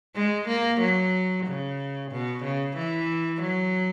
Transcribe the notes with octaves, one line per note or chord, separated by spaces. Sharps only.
G#3
A#3
F#3
C#3
B2
C#3
E3
F#3